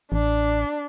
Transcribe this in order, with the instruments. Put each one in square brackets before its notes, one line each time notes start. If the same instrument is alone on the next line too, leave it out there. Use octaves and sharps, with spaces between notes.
[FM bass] A1 [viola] D4